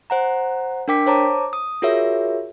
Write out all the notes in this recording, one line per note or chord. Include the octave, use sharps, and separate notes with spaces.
C5 F#5 A#5
D4 A#4 G5 D6 B6
C5 C#5 A5 A#5 D6
D#6
F4 F#4 G#4 A#4 C#5 E5